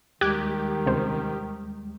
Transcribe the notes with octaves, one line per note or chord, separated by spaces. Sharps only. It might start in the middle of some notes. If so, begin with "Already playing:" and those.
D#2 D#3 G3 G#3 G4 D6 F#6 G#6
C#2 C3 C5